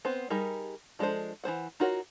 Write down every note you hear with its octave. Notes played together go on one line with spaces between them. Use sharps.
B3 C4 C5
G3 D#4 G#4 A#4
F3 G#3 D4 A4 C5
E3 C#4 C5 F#5
D#4 F4 F#4 A#4 C#5